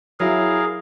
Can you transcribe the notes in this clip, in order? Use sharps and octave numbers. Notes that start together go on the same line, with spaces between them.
F#3 E4 G#4 A#4 F5